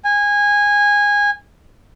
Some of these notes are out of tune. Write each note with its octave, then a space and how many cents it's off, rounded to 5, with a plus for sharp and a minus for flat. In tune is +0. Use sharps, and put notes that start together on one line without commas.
G#5 -20